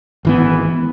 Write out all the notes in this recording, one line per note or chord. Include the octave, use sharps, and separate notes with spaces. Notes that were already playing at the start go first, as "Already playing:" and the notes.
G#1 E3 B3